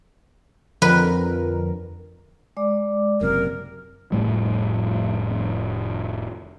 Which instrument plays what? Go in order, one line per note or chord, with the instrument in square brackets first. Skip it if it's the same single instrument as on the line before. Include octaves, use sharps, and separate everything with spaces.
[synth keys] F2 D3 A#4 [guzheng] B4
[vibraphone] G#3 D5 D6
[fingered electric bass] F#1 F#2 C3 [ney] A#4
[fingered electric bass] F1 A2 G3